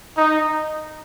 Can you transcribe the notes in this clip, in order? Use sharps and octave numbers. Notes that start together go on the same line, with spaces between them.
D#4